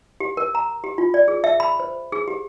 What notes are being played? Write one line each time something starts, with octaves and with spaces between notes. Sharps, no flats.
G4
A#4
A#5
G4
F4
D5
G#4
E5
B5
C5
G#4
G4